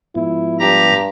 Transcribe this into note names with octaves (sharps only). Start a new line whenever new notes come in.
G#2 F3 B3 E4
G2 G4 A#5 A#6